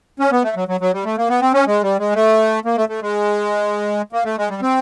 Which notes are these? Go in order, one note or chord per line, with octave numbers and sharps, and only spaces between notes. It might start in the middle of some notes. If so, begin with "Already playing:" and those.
C#4
B3
A3
F#3
F#3
F#3
G3
A3
A#3
B3
C4
C#4
G#3
G3
G#3
A3
A#3
A3
A3
G#3
A#3
A3
G#3
G3
C4